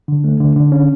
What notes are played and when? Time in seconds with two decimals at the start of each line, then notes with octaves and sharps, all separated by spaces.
0.08 D3
0.24 A3
0.40 D3
0.56 D3
0.72 C#4